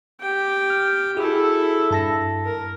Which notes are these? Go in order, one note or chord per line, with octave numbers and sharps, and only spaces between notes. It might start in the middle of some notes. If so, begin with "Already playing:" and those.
G4 G5
F6
E4 F#4 G#4 A4
G2 A5 A#6
A#4